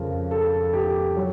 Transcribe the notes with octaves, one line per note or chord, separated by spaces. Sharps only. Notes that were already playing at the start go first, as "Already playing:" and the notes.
Already playing: F2 C#3 F3 A#4
A4
G4
F#3